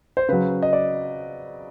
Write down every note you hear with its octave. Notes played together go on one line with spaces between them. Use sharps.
C5
C#3 F#3 B4
D#5
D5